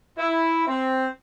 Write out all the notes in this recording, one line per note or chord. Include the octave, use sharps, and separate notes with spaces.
E4
C4